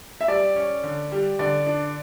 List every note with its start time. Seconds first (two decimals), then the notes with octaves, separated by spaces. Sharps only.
0.21 E5
0.28 G3 D5
0.56 C#4
0.83 D3
1.12 G3
1.39 D3 D5
1.66 D4